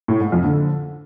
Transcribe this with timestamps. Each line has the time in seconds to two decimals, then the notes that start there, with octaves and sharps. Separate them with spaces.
0.08 A2
0.20 G#2
0.32 F2
0.44 D3